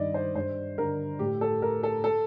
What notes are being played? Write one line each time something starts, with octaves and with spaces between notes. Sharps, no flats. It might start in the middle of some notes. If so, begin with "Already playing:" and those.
Already playing: G2 D#3 D5 D#5
C5
G2 C5
D3 A#4
A2 G4
A4
A#4
A4
A4